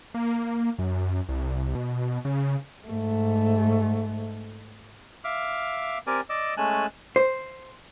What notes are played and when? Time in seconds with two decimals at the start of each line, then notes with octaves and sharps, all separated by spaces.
0.14 A#3
0.78 F#2
1.29 C2
1.75 B2
2.25 C#3
2.88 G#2 A3
5.24 E5 F5 D6 F6
6.07 C4 G4 A#4 D5 G#5
6.30 D5 D#5 D6 E6
6.57 G#3 A3 C#4 G#5 A5 F#6
7.16 C5